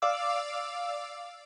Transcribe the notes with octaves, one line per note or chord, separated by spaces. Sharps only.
D5 F5 D6 E6